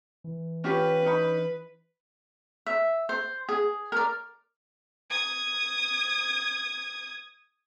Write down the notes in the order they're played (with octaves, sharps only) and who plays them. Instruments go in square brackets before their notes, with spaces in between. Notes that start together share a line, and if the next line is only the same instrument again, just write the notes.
[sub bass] E3
[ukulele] C#4 F4 G4 [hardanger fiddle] B4
[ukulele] C#4 D#4 B5
[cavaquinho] E5
C5
G#4
A#4 D5
[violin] D#6 G#6